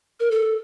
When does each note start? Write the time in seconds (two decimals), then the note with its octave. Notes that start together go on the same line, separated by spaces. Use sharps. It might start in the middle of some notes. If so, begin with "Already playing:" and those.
0.20 A#4
0.31 A4